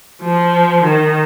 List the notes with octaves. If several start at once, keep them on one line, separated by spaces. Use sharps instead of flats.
F3
D#3